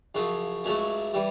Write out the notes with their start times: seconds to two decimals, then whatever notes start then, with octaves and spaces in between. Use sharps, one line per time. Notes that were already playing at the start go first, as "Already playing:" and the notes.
0.15 F#2 C#3 F3
0.64 C#2 C#3 F#3 A3 C#4
1.14 E3 G3